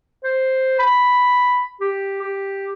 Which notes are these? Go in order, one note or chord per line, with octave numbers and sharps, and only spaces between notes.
C5
B5
G4
G4